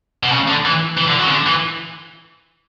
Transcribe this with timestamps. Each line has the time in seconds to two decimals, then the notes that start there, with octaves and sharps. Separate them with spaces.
0.23 B2
0.31 C#3
0.48 D3
0.65 E3
0.97 E3
1.08 D3
1.19 F#3
1.26 C#3
1.31 D3
1.47 E3